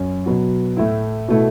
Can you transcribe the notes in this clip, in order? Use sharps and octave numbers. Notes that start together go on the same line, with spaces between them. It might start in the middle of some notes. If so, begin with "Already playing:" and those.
Already playing: F#2 C#4
B2 F#3 B3 F#4
A2 A3 E4
B2 A3 E4